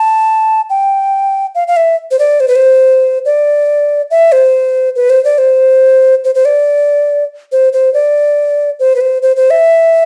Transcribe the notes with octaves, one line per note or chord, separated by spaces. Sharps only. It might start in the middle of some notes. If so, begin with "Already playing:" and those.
Already playing: A5
G5
F5
F5
E5
C5
D5
C5
B4
C5
D5
E5
C5
B4
C5
D5
C5
C5
C5
D5
C5
C5
D5
C5
B4
C5
C5
C5
E5